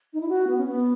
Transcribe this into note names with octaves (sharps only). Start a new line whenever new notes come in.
D#4
E4
F#4
B3
C#4
B3